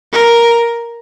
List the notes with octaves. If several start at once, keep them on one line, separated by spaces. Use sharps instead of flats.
A#4